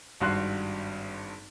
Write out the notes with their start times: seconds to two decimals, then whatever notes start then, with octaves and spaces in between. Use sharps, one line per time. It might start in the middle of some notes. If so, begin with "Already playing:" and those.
0.20 G#1 G2 F#4 C6 F#6